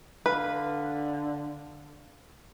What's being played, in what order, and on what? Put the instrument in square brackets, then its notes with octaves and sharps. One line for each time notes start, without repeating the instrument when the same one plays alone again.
[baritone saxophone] D3 [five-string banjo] B4 [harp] F5